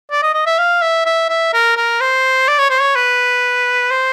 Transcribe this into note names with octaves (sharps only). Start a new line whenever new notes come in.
D5
D#5
D#5
E5
F5
E5
E5
E5
A#4
A#4
C5
D5
C#5
C5
C#5
B4
C5